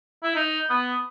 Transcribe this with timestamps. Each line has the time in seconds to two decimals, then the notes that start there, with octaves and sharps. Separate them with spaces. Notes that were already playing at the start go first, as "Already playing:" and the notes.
0.24 E4
0.36 D#4
0.70 B3